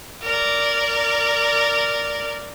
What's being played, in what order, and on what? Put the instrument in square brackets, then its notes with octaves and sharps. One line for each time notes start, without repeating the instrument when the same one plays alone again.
[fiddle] A#4 D5